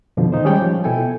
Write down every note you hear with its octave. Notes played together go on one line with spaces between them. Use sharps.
F2 B2 D3 F3
A2 D#3 D#4 C5
G3 G#3 C#4 C#5 D5 G5
F3
B2 E4 A4 G5 G#5